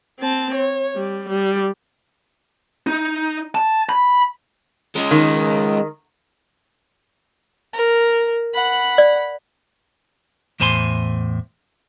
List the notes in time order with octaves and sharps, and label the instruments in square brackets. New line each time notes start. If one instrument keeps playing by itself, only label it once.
[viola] C4 A5
C#5
G3
G3
[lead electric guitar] D#4
A5
B5
[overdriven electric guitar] G#3 C#4
[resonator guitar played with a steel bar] D#3
[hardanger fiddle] A#4
F#5 B5
[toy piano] D5
[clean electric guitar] E2 A2 C5 G#5 A#5 C6